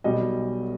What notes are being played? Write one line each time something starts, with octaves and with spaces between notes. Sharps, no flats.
B1 B2 G3 D#5